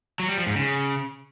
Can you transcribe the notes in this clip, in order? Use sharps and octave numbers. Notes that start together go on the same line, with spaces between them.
F#3
G3
F3
G#2
C#3